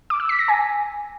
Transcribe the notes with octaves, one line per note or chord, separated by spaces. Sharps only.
D6
E6
B6
A#6
G#5